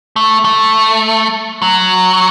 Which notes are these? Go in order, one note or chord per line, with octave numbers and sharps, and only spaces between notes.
A3
A3
F#3